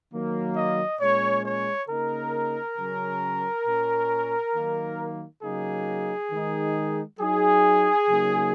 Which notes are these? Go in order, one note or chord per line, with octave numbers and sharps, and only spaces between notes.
D#3 F#3 A#3
D#5
A#2 G#3 C#4 C#5
C#5
C#3 A#3 D#4 A#4
C#3 F#3 C#4
A#2 A#3 C#4
D#3 F#3 A#3 D#4
C#3 F#3 A#3 D#4 G#4
D#3 G#3 D#4
F#3 D#4 G#4
C#3 F#3 A#3 D#4